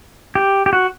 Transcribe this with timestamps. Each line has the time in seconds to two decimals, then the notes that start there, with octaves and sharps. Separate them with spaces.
0.35 G4
0.66 G4
0.73 F#4